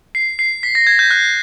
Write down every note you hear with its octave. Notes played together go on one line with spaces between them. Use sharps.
C7
C7
B6
A#6
G#6
G6
F#6